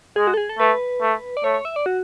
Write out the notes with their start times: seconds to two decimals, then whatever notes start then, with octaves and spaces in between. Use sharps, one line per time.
0.16 G#3 G#4
0.27 F#4
0.34 A4
0.37 G#4
0.49 A4
0.59 A3 B4
1.01 A3
1.37 D5
1.44 A3 C#5
1.54 C#5
1.65 E5
1.76 D5
1.86 F#4